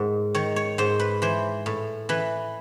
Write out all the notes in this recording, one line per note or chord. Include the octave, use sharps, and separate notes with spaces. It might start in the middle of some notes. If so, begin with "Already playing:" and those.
Already playing: G#2 D#3
D#3 C#5
C#5
G#2 C5
B4
E3 C5
A2
E3 B4